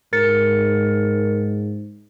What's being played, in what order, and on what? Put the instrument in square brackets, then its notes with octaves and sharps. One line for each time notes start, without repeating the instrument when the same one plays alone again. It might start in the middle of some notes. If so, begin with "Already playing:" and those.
[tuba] G#2 [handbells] A#4 A6 C#7